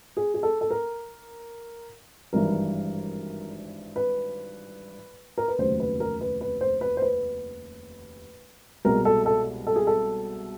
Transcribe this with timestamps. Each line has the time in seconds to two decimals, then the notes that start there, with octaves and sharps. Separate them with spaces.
0.17 G#4
0.34 G#4
0.43 A4
0.61 A4
0.70 A#4
2.33 G#1 G2 E3 A#4
3.96 B4
5.38 A#4
5.48 B4
5.58 F1 D#2 C#3 F#3 C5
5.80 B4
6.00 A#4
6.21 B4
6.41 B4
6.61 C5
6.81 B4
6.97 C5
7.02 B4
8.85 C2 B2 G#3 A#4
9.05 A4
9.26 A4
9.67 A4
9.76 G#4
9.87 A4